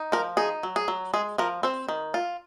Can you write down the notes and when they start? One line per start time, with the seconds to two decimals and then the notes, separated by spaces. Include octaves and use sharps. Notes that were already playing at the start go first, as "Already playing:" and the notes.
Already playing: D#4
0.12 F3 A#4
0.37 D#4 G#4
0.63 F#3
0.76 G#4
0.88 F#3
1.14 G#3 G#4
1.38 F3 A#4
1.63 C4 C5
1.89 D#3
2.14 F4